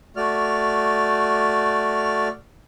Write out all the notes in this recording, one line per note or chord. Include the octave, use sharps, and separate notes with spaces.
A3 F#4 D5 F6